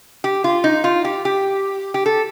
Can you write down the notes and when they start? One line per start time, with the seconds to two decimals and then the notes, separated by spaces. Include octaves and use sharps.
0.24 G4
0.44 F4
0.64 D#4
0.84 F4
1.05 G4
1.25 G4
1.94 G4
2.06 A4